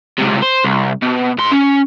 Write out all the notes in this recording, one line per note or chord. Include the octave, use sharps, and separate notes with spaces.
C#2 C3
C5
C2
B2
G#2 C6
C#4